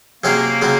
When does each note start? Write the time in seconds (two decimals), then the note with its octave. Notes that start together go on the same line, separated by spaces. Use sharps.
0.23 C3 F#3 A#3 C#4 G#4 C5
0.62 C#3 F#3 C4 F4